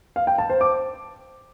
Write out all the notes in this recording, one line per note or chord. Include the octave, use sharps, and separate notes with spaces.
F5
G5
A5
C5
D6